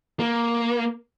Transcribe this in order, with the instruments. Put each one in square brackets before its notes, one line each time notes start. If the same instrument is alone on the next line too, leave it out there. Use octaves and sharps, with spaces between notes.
[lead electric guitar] A#3